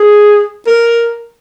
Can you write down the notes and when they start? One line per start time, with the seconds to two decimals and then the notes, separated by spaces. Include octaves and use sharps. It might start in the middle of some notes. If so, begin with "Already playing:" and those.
Already playing: G#4
0.67 A#4